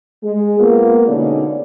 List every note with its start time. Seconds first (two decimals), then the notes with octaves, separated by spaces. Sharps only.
0.24 G#3
0.60 A#3 B3 F4
1.08 B2 D3 G#3 C#4 D#4 D5